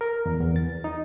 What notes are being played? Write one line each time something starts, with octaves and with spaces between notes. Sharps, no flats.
A#4
E2
E2
A6
D#4